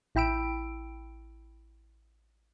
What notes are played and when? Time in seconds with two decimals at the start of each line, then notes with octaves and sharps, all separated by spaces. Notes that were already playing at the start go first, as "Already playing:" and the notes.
0.15 A1 E4 G5 B5 E6 D7